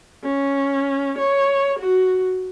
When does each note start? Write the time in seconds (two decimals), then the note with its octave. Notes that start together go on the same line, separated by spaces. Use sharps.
0.24 C#4
1.19 C#5
1.79 F#4